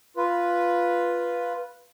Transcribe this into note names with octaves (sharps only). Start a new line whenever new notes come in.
F4 B4